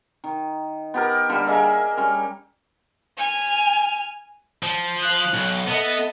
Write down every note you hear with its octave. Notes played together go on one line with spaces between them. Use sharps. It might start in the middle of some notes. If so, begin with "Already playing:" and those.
D#3
B3 G4 A#4
D3 G3 A#3
A#3 G#4 D#5 E5
G3 C#4
G#5 F6
F3
F5 F#6
B1
B3 A4 D#5 E5